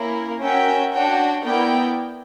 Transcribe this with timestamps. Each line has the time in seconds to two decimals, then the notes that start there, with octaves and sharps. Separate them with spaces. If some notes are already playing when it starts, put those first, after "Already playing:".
Already playing: A#3 C#4 E4 A#4
0.42 C#4 F#4 A#4 E5 G5
0.94 D4 F#4 C#5 G5
1.44 B3 E4 A#4 D5 G5